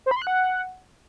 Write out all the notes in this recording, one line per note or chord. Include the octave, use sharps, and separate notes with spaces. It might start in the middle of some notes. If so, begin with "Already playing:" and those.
C5
B5
C6
F#6
F#5